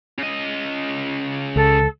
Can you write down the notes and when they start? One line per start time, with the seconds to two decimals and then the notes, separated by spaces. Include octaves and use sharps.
0.18 C#3 D#5
1.56 C#2 A4